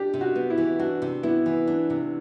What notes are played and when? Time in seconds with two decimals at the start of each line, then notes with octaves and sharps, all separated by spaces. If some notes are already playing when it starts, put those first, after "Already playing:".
Already playing: D4 G4
0.14 C3
0.21 F#4
0.36 B3
0.50 E4
0.58 E3
0.79 D4 F#4
1.02 C3
1.23 B3 E4
1.46 E3
1.67 D4
1.90 C3